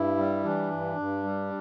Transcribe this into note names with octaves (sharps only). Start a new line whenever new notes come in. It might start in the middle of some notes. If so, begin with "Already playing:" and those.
Already playing: G2 E4
G3
E3 D4
G2
G2
G3